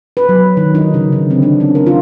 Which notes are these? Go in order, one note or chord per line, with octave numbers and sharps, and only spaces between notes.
B4
F#3
D#3
D#4
C#3
D3
C4
D4
C#4
A#4
F4